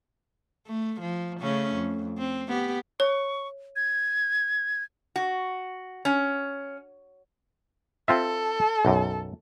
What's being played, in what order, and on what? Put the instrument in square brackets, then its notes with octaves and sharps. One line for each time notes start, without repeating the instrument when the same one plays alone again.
[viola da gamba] A3
F3
C#3 A3 C#4
F2
C4
B3 G4
[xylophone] C#5 [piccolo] C#6
[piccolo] G#6
[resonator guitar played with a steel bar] F#4
C#4
[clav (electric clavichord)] C4 F4 E5 [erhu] A4
[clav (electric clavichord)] B1 F#2